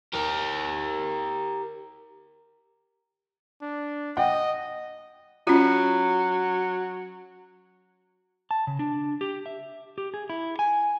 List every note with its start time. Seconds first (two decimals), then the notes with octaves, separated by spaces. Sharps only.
0.15 G4 A#4
3.62 D4
4.17 D#5 F#5 G5
5.47 F#3 C#4 F4
8.51 A5
8.67 C#3
8.79 D4
9.21 G4
9.46 E5
9.98 G4
10.14 G#4
10.30 E4
10.59 G#5